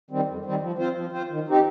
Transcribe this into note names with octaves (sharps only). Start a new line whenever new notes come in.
D#3 G3 C4
F2
D#3 G3 C4
F3
C4 F4 C5
F3
C4 F4 C5
D#3
C4 D#4 G4